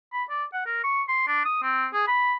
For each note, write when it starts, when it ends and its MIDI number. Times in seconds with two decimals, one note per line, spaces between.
0.13 0.24 83
0.30 0.44 74
0.53 0.62 78
0.66 0.84 70
0.84 1.03 85
1.08 1.25 84
1.27 1.44 62
1.45 1.58 87
1.63 1.87 60
1.93 2.04 68
2.08 2.35 83